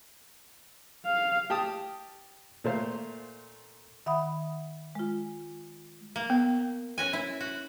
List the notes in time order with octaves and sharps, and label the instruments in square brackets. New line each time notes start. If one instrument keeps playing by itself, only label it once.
[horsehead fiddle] F5
[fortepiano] G4 G5 A5 D#6
A#2 A3 C5 F5
[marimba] D#3 E5 F#5 B5 D#6
G#3 F4
[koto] A#3
[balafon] B3
[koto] C#4 F#4 G#5
E4
F#4